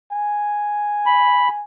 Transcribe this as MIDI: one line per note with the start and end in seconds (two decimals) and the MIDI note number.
0.12 1.64 80
1.06 1.48 83